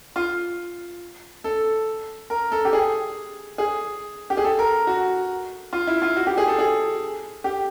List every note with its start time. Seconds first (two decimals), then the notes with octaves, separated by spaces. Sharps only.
0.16 F4
1.44 A4
2.30 A#4
2.52 A4
2.65 G4
2.73 G#4
3.58 G#4
4.30 G4
4.37 G#4
4.44 A4
4.59 A#4
4.87 F#4
5.73 F4
5.87 E4
6.02 F4
6.16 F#4
6.27 G4
6.37 G#4
6.48 A4
6.59 G#4
7.44 G4